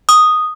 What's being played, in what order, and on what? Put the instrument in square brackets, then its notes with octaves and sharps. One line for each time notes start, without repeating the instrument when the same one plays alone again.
[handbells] D#6